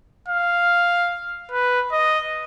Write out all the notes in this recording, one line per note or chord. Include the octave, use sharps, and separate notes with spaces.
F5
B4
D#5